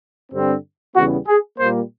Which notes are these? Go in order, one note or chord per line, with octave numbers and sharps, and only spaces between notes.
G2 D3 G3 C4
E2 C#3 E3 G3 B3 F#4
G#4
A#2 G3 A#3 C5